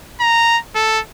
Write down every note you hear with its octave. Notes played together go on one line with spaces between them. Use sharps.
A#5
A4